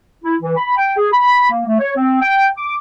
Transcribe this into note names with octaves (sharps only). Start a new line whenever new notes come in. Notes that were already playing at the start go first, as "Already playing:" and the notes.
E4
E3
B5
G5
G#4
B5
A#3
A3
C#5
C4
G5
D6